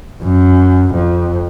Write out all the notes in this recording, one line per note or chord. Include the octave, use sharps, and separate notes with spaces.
F#2
F2